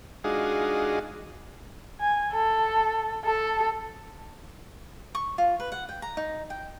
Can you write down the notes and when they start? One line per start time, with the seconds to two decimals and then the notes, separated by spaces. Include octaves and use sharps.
0.24 G#3 D4 D#4 F4 F#4 G#4
2.00 G#5
2.32 A4
3.24 A4
5.15 C#6
5.38 F4
5.60 B4
5.72 F#5
5.89 G5
6.02 A#5
6.17 D#4
6.50 G5